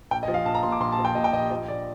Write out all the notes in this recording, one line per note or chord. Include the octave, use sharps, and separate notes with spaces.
A#1 G5
D#5
F3
F5
A#1 A5
A#5
A#2 C6
D6
A#1 C6
A5
F3
G5
A#2 D#5
G5
A#1 D#5
F3 D#5
A#1 D5